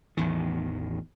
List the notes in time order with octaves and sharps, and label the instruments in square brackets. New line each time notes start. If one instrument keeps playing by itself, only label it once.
[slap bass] A1 E2 D#3